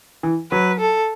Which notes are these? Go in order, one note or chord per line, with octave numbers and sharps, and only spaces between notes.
E3
F#3 B4
A4